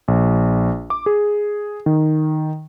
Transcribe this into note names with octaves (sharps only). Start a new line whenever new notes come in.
A#1
D6
G#4
D#3